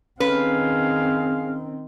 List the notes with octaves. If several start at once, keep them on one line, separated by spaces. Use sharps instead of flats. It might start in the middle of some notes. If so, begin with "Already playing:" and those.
D#3 C4 C#4 G#4 B4 F5